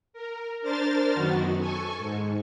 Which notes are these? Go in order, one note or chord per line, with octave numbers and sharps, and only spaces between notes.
A#4
D4 A#4 C5 F6 A6
F#2 D#3 B3 F#4
A4 G#5 C#6
G#2